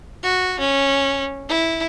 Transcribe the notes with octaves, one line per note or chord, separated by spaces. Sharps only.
F#4
C#4
E4